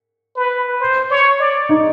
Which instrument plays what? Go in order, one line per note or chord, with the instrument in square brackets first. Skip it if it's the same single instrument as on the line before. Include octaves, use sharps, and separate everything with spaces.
[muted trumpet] B4
C5
C#5
D5
[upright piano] D#4